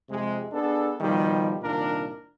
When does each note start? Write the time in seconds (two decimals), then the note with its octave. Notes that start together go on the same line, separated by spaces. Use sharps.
0.10 F2 C3 G#3
0.53 B3 D4 G#4 A4
1.01 B2 D#3 F3 G3
1.62 C2 A#2 D#3 D4 A#4